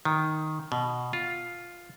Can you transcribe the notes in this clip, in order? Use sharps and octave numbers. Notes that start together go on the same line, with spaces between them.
D#3
B2
F4